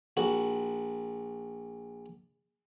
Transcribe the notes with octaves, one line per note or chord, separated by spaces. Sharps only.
A#1 F#4